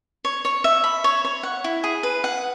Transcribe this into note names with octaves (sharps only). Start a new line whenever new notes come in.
C#5
C#5
E5
B5
C#5
C#5
F#5
E4
G#4
B4
F#5